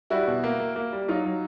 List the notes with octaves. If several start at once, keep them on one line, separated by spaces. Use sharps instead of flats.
G3 E4 F#4
B2
A#3
A#3
A#3
G3
F#3 D#4 F4
F#3